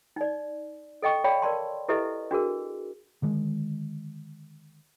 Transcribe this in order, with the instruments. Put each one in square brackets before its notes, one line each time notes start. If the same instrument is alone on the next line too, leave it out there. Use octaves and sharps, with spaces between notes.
[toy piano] D#4 D5
A4 D#5 G5 C#6
C#5 D5 F5 G5 B5
A#4 D5 A5 C6
E4 G4 A4 B4 D#5 E5
D4 F#4 G#4 A#4
[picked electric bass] D3 D#3 G#3